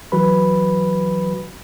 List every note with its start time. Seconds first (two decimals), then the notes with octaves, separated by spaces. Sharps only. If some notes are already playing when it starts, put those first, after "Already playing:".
0.12 E3 F#3 F#4 B4 B5